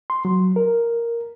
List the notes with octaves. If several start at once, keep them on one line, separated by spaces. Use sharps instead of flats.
C6
F#3
A#4